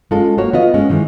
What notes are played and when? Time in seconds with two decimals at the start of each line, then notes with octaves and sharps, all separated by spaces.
0.11 G#3 C#4 F4 A4
0.38 A#3 F#4 C#5
0.53 B3 F4 D#5
0.74 G#3 C#4
0.89 D#3 E3 G#3